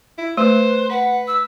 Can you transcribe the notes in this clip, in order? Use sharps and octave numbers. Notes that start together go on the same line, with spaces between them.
E4
A3 B4 C5
B4 F#5
E6